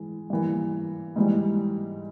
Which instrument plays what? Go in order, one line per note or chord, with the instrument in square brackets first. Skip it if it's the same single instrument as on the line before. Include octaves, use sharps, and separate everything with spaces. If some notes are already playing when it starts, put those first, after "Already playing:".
Already playing: [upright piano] E3 G#3
G2 E3 A#3
G#2 E3 G3